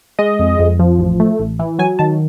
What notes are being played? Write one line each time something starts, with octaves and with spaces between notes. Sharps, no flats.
G#3 D#5
F2
F2
F3
A1
A3
A1
E3
F#3 G#5
D#3 A5